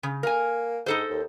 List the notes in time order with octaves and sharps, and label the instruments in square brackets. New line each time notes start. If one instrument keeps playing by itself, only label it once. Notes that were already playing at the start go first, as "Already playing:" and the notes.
[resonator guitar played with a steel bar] C#3
[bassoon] A#3 [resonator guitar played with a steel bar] A#4 G#5
[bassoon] G#2 [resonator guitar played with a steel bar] D#4 A4 C5
[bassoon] D#2